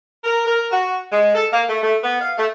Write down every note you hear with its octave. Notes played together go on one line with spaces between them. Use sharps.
A#4
A#4
F#4
G#3
A4
A#3
A3
A3
B3
F5
A3